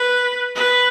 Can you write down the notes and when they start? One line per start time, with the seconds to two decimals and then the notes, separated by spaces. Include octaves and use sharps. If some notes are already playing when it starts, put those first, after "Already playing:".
Already playing: B4
0.55 B4